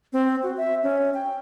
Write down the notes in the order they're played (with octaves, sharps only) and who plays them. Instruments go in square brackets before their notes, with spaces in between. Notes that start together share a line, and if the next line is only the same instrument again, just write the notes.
[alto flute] C4
F#4
E5
C#4
G5